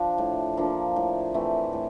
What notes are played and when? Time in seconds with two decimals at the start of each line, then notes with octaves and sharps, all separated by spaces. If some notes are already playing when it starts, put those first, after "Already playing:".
Already playing: F3 D4
0.18 A2
0.57 F3 A#3 D4
0.96 A2
1.34 E3 A3 C4
1.73 A2